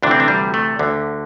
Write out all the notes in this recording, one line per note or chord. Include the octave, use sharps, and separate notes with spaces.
D2 C3 E3 D4
C4
D4
G3
A3
D2 D3